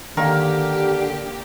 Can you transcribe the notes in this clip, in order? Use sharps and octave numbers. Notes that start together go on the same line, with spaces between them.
D3 D#3 A#3 G4 A#4